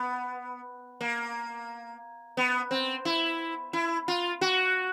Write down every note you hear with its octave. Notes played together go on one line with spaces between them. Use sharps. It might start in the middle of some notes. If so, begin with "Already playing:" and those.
Already playing: B3
A#3
B3
C4
E4
E4
F4
F#4